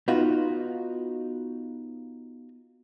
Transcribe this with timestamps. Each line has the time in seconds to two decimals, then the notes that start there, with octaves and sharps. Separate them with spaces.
0.08 B3 D#4 F4 F#4